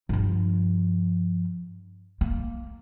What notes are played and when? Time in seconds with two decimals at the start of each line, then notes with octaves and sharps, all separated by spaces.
0.09 G2 F3
2.21 A#3